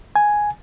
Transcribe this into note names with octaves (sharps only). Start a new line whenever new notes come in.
G#5